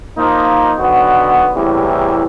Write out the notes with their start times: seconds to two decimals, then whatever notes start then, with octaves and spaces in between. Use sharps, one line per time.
0.16 F3 A#3 D#4
0.78 B1 D3 B3 F#4
1.55 E2 A2 C3 G3